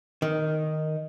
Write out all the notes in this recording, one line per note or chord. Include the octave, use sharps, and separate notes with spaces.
D#3